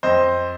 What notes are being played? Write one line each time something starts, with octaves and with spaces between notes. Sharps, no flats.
F2 C5 D#5